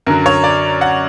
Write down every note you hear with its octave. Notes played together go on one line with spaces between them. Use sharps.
F#2 D3 F#3 A#4
C#5
D5
F#5